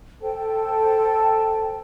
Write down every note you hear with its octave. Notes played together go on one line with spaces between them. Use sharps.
A4 C5 G5 A5